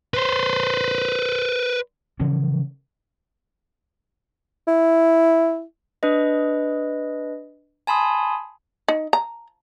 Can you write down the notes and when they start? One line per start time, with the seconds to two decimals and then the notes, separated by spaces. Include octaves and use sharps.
0.14 B4 C5
2.20 C#3 E3 F3 C#4
4.68 E4
6.03 D4 B4 D#5
7.87 G#5 A5 B5 C6 D#6
8.88 D#4
9.13 A#5